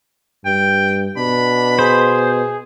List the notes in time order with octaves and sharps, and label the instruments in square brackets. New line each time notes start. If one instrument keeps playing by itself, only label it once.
[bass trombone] G2 [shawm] G5
[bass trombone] B2 [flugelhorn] D4 [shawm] B5
[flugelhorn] G#4 [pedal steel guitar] C5